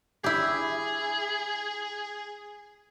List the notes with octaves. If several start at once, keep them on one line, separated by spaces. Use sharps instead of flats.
E4 G4 G#4